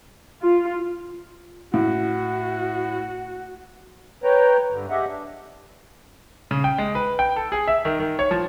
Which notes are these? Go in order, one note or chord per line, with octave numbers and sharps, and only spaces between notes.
F4
A2 F#4
B4 C#5 G5 A#5
G2 D3
G4 G#4 D#5 E5 F#5
D4
C#3
G5
G#3
B4
G5
A4
G#4
E5
D#3
D#3
C#5
F3